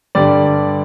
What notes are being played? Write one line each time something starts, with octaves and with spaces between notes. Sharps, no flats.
G2 D3 G3 D5